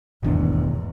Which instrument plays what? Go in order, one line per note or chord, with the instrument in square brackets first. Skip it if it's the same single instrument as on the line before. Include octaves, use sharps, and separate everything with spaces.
[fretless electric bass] D#1 G#1 D4 [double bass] E2 G#2 [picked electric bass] B2 D#3 A3